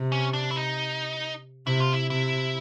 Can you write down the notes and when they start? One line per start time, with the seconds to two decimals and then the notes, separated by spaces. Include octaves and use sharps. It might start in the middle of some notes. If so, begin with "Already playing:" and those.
Already playing: C3
0.12 C#4
0.33 D4
0.51 E4
0.56 D#4
1.66 C3 E4
1.80 F4
1.93 E4
2.10 C3 E4